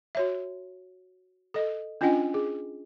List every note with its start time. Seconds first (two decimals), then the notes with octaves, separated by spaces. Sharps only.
0.15 F#4 C#5 E5
1.54 A4 D#5
2.01 C#4 D4 F4 D#5 G5 G#5
2.34 G#4